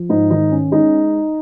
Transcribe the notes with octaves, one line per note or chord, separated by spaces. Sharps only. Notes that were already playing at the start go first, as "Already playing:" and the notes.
Already playing: F3
G#2 D#4
D#3 D#4
C#4
G#3 D#4